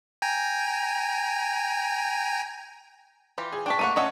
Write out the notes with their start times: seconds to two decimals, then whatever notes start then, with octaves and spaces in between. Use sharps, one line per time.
0.22 G5 G#5 A#5
3.38 E3 F4 G4
3.52 G#4
3.66 D4 G5 A5 C#6 B6
3.79 A3 A#3 F#5 C#6 D#7
3.96 A3 C#4 D#5 E5 F#5 A5